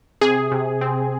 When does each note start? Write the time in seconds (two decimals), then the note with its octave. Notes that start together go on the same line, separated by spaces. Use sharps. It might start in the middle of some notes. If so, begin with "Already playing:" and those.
0.21 C3 G#4
0.52 C3
0.81 C4